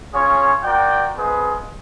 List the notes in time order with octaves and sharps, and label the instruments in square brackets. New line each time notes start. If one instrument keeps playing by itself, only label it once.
[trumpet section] C#4 F4 G#4 C#5
F#4 A#4 D5 G5
C4 F4 G#4 B4 D#5